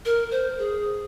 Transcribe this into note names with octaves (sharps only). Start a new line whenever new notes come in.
A#4
C5
G#4